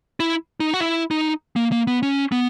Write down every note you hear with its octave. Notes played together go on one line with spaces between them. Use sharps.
E4
D#4
F#4
E4
D#4
A#3
A#3
B3
C#4
B3